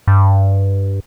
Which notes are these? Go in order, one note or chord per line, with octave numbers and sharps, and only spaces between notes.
G2